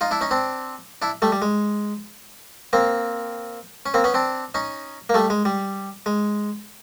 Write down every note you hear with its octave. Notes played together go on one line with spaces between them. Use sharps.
D#4 F4
D4 E4
C#4 D#4
C4 D4
D4 E4
G3 A3
G3
G#3
A#3 C4
C#4
A#3 C4
B3 C#4
C4 D4
C#4 D#4
A#3
G3 A3
G#3
G3
G#3